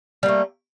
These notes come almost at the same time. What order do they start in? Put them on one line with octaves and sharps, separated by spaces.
G3 A#3 A3